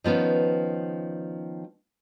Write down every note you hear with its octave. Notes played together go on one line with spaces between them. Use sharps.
D#3 F3 B3 C#4